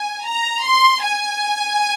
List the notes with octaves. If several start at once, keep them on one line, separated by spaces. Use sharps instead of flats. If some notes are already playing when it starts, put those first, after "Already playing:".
Already playing: G#5
A#5
C6
G#5